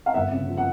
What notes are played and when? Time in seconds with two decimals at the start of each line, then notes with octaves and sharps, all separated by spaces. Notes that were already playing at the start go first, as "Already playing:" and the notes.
0.06 F5
0.14 G1 E5 F#5
0.31 C#3
0.48 F3
0.57 F#5